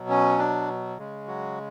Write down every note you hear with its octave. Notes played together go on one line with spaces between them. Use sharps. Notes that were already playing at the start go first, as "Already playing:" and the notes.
Already playing: B2 F#3
C#4
D4
C#3 G#3
F#3 F#4